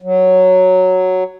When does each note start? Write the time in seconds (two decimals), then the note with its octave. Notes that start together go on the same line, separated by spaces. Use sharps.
0.02 F#3